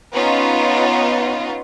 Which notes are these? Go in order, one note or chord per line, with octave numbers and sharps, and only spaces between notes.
B3 C#4 D#4 F4